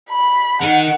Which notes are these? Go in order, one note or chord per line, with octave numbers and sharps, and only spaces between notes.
B5
D#4 A#4 F#5